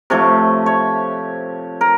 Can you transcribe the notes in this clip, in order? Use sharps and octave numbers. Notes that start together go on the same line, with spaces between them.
C3 F3 A3 C#5
C#5
A#4